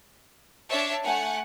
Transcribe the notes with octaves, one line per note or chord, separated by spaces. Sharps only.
D4 C#5 E5 A5
A3 F#5 G#5